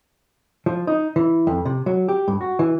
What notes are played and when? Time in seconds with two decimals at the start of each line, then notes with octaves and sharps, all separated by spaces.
0.66 F3
0.87 D#4
1.16 E3
1.47 F2
1.65 C3
1.86 F#3
2.08 G4
2.28 G2
2.41 F#4
2.59 E3